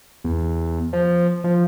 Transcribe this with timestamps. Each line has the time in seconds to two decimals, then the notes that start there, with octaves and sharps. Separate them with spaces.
0.24 E2
0.93 F3
1.44 F3